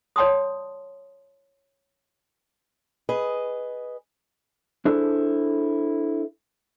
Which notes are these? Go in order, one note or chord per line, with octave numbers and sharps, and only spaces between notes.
C#5 D5 G5 A5 C6 D#6
G#4 B4 D#5
D4 E4 G#4 A4 C5